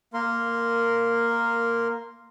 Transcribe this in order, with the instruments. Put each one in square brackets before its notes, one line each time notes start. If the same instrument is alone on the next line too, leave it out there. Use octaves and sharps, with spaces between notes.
[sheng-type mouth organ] A#3 A#4 C6